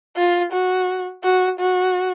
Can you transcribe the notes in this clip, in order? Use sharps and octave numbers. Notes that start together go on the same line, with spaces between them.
F4
F#4
F#4
F#4